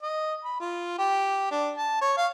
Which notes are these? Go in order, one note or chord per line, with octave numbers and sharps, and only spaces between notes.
D#5
B5
F4
G4
D4
A5
C#5
F5